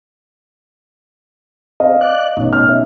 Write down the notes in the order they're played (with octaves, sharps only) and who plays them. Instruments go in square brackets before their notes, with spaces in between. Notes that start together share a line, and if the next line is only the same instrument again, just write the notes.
[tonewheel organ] C4 [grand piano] D#5 F5
[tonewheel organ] D5 F#6
[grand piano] A1 [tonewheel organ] B2 C#4 D#4
[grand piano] F6
E5